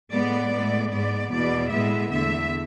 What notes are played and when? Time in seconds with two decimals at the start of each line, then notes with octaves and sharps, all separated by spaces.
0.12 A2 G#3 B3 D5
0.53 A2 G#3 B3
0.92 G#2 G#3 B3 D5
1.32 E2 B2 B3 D5
1.72 A2 G#3 B3 E5
2.12 E2 D3 A3 E5